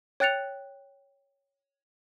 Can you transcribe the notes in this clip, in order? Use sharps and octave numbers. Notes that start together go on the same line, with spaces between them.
C#5 G5 F#6 A6 C#7 F7